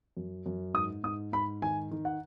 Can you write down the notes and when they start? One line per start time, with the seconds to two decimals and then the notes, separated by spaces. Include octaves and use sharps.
0.17 F#2
0.46 F#2
0.74 G#2 D#6
1.04 G#2 D#6
1.32 G#2 B5
1.62 D#3 G#5
1.91 D#3
2.05 F#5